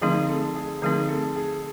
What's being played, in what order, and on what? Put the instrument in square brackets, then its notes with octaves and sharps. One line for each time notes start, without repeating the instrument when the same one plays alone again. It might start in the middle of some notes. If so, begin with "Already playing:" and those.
[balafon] D3 F3 A3 C4 D#4 [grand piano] G#4
[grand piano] A4
G#4
[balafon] D3 F3 A3 C4 D#4 [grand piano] G#4
[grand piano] A4
G#4